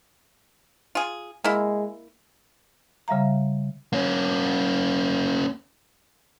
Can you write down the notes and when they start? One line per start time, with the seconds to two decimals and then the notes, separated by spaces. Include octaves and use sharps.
0.95 F4 G#4
1.44 G#3 A#3 E4
3.08 C#3 G3 E5 F5 A#5
3.93 A#3 C#4